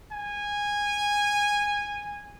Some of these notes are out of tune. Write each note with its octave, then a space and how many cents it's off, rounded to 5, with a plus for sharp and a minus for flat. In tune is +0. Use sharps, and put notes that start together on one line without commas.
G#5 -15